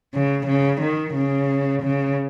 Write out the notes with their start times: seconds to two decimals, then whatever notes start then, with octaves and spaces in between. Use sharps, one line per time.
0.14 C#3
0.47 C#3
0.82 D#3
1.15 C#3
1.83 C#3